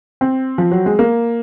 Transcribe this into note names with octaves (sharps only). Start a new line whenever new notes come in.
C4
F3
F#3
G#3
A#3